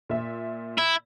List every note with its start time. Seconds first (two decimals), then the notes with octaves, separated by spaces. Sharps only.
0.09 A#2 E5
0.78 E4